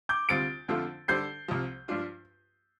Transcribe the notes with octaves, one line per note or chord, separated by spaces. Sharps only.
D6 G6
D2 C3 G3 C4 F4 A6 D7
F2 D3 F3 A3 F4
D3 G3 D4 A4 C5 G6 C7
C2 C3 F3
G2 F3 D4 F4